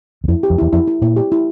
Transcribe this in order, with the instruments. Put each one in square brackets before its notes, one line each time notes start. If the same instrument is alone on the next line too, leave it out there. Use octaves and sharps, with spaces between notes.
[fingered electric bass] E2
[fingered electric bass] F2 [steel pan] E4
[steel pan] G4
[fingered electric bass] F2
[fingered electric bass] E2 [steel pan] E4
[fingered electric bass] F2 [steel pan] E4
[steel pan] E4
[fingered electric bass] A#2 [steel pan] E4
[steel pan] G4
E4